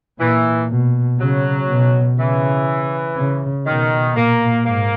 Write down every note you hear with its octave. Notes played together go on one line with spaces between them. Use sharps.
A#2 E3
B2
C#3 F#3
B2
C#3 E3
C#3
B2 D#3
A#2 A#3
G#2 A#3